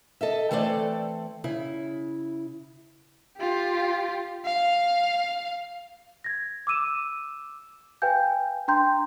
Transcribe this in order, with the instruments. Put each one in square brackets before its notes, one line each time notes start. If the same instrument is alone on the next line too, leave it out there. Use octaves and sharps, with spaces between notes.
[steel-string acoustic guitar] A4 D#5 E5
E3 A3 C4 A4 D5
C#3 E4
[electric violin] F4 G4
F5
[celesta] G#6 A#6
D6 E6 D#7 E7
B4 F5 G5 G#5 G6
D4 G5 A#5 C6 G6